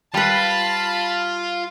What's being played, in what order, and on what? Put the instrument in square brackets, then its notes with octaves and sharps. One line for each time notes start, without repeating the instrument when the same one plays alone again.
[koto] G3 B4 [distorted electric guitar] F4 [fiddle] A5 B5